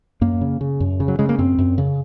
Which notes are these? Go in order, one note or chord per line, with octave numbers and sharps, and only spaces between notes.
F#2 A#3
C#3
C#3
F#2
C#3
F#3
C#3 G#3
A#3
F#2 C4
F#2
C#3